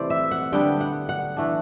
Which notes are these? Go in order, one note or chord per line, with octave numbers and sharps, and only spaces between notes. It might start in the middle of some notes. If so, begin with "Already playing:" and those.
Already playing: C3 E3 A3 E4 C5 D5
E5
F#5
D3 G3 B3 D4 G5
F#5
F#5
E3 A3 D4